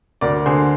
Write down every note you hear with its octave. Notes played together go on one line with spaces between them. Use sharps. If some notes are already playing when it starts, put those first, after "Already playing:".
D2 A#4 D5
D3 G#4 C5